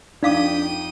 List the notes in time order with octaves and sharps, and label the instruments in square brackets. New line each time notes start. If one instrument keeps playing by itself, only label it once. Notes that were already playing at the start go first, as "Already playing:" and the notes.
[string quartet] F2 G5 D#6 [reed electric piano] D4 [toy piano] D#4 F5 D6